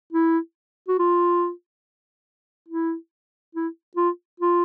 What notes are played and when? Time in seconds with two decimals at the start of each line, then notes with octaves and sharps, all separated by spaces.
0.12 E4
0.88 F#4
0.99 F4
2.68 E4
3.55 E4
3.96 F4
4.40 F4